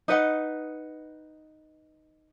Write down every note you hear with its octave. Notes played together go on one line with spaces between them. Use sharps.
D#4 B4 D#5 F#5